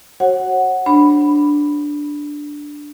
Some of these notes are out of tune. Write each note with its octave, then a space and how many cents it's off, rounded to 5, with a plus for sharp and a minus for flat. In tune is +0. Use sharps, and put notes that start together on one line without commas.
F#4 +20 C#5 -40 F#5 +0
D4 +0 B5 +0